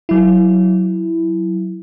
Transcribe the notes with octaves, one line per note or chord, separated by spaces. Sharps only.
F#3 E4